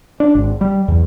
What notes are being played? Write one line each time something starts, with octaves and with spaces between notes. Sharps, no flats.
D4
G#1
G3
E2